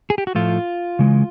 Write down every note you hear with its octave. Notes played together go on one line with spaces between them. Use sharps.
G#4
G4
F#4
A2 F3 A3 F4
C#3 E3 G#3